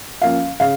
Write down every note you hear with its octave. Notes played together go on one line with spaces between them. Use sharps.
F3 A#3 C#4 F5
C#3 F5